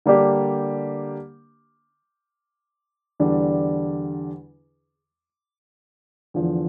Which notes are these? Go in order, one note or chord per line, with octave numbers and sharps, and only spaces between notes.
D3 G3 A#3 D4 G4
E2 D3 G3 D4
E2 D3 F3